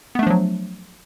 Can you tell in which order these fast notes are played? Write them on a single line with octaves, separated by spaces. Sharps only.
B3 A3 D4 F3 F#3